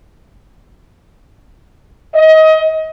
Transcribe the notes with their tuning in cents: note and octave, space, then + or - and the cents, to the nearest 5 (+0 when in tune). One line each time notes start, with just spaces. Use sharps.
D#5 +25